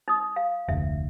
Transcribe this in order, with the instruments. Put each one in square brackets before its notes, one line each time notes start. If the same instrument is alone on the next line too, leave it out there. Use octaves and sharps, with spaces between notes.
[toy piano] D#4 D#6
F5
[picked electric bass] F1 D2 [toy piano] E5